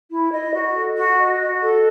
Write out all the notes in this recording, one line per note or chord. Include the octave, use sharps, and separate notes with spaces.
E4
D#5
F#4
A4
F#4
D#5
F#4
A4